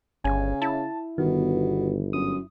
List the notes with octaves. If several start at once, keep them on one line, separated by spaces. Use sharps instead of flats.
G1 C#3 G#5
E4 A5
G1 B2 D#3
F#2 D#6